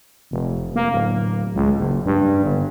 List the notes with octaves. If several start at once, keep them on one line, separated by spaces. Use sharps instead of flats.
F1
A#3
D1
C#2
F#1
G2
G1